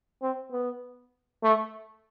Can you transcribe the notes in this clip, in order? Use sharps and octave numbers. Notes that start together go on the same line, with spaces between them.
C4
B3
A3